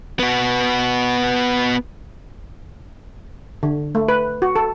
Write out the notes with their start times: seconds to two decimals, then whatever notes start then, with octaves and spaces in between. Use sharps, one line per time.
0.19 B3 F#4
3.63 D3
3.95 A3
4.08 B4
4.42 F#4
4.56 A4